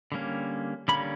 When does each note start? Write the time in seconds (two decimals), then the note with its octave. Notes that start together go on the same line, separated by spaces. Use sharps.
0.12 D3 G3 A#3 C#4
0.88 D3 G3 A#3 C#4 B5